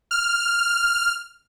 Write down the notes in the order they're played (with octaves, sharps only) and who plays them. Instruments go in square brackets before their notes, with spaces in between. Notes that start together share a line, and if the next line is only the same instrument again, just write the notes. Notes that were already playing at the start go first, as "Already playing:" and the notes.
[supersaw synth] F6